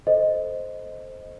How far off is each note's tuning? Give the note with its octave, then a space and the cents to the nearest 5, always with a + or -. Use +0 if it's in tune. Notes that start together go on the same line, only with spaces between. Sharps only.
A4 +0 C5 +0 D#5 +0